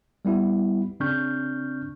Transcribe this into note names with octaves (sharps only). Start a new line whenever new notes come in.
G3 B3 E4 G4
C#3 C4 D4 C#6 F6 G6